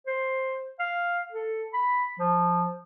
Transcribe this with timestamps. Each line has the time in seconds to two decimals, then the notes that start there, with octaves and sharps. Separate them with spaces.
0.07 C5
0.79 F5
1.32 A4
1.73 B5
2.19 F3